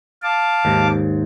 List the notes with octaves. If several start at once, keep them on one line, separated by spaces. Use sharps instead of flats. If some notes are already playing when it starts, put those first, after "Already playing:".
F5 A5 D6
D#2 G#2